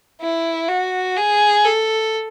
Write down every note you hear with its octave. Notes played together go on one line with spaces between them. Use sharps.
E4
F#4
G#4
A4